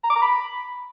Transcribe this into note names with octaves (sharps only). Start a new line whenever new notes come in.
A#5
D6
A#5
B5